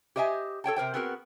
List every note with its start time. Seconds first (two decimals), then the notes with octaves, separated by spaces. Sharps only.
0.16 G4 C5 D#5 E5 G5 G#5
0.64 A4 C#5 G5 A5
0.76 C3 A#4 C5 G5
0.94 B3 C4 F#4 G#4 A#4